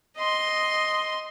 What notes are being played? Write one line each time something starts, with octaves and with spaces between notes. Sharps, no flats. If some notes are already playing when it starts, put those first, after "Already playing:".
D#5 C6